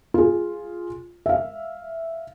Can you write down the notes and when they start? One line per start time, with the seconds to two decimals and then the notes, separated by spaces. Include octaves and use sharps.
0.14 F4 G#4
1.26 E5 F5